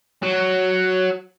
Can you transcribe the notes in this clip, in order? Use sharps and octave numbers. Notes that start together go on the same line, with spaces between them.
F#3 F#4